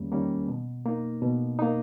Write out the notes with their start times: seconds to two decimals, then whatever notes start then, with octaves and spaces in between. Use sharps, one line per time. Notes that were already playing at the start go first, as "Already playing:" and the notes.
Already playing: E2 D#3 G3 A#3 C#4
0.12 D#3 G3 A#3 C#4
0.48 B2
0.86 A#3 D#4
1.22 B2
1.59 A#3 D#4